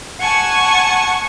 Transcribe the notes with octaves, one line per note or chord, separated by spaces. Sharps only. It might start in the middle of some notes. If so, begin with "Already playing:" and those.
F#5 G#5 A5 C#6